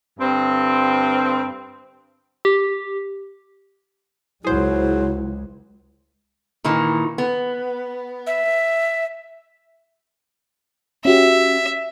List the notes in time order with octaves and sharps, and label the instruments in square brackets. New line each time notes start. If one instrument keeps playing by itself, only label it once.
[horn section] G2 D3 C4
[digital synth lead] G4
[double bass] C#2 G#3 [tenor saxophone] F#3 [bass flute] E4 [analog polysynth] G#4 C5
[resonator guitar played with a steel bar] A#2 D#3 E3
B3
[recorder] E5
[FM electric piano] C#4 F#4 G4 [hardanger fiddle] E5